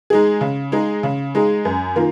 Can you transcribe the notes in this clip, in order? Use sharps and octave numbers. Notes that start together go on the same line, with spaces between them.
G#3 D#4 G#4
C#3
G#3 D#4 G#4
C#3
G#3 D#4 G#4
F#2
D#3 A#3 F4